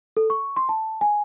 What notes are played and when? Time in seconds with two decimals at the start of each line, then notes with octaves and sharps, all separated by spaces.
0.17 A4
0.30 C#6
0.56 C6
0.69 A5
1.01 G#5